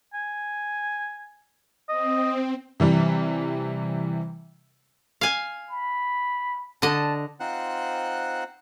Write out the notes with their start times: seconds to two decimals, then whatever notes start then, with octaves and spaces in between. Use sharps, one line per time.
0.14 G#5
1.89 C4 D#5
2.80 C3 E3 G3
5.21 F5 G#5
5.70 B5
6.82 D3 D#5 A5
7.40 C4 D#4 F4 C5 F#5 F#6